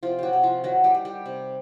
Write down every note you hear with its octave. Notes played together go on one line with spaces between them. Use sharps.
C3 F3 F4
F#3 F#4 G4
C3
F3 F4
D#3 F#3 F#4
G3 G4
G3
G3 G4
C3